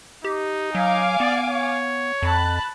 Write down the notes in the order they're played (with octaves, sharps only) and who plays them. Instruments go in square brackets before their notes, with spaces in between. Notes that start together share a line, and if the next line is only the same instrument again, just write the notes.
[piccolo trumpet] D#4 [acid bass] G4
[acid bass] F#3 [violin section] F5 G#5 D6
[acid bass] B3 [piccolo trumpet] D5
[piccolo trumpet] C#5
[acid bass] F2 [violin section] A5 B5 F#6